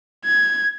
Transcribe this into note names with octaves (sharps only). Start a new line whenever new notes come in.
G#6